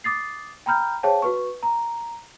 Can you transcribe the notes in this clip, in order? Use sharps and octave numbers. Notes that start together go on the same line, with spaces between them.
D6 D#6 A6 C7
G5 A#5 B5 F6 G6
G#4 C5 C#5 F5 G5 A5
F#4 B4 C#6
A#5